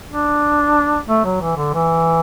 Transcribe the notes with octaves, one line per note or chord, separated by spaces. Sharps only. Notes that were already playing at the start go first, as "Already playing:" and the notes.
D4
A3
F#3
E3
D3
E3